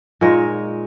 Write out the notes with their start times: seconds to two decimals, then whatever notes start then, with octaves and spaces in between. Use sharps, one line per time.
0.21 A#2 G#3 D#4 C#5